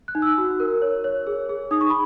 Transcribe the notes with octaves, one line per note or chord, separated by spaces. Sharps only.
F#6
D#4
E6
F#4
A#4
C#5
C#5
G#4
G#4
D#4 D#6
C#6
B5